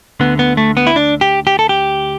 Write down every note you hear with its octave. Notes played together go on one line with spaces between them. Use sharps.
D2 D3 B3
B3
A3
B3
E4
D4
G4
G4
A4
G4